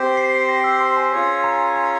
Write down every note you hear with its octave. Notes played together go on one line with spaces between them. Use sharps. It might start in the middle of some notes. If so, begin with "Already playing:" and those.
Already playing: C4 G4 C5
C7
A#6
E6
C6
G#5
C#4 F4 G#4 C#5 C6
A#5
A#5